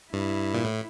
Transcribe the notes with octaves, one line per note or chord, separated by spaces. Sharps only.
G2 E4
A#2
A2